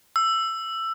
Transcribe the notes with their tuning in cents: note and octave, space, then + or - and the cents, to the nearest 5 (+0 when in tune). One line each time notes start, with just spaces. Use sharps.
E6 +15